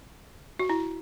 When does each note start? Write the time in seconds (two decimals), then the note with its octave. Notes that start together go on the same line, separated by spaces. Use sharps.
0.59 F#4
0.70 E4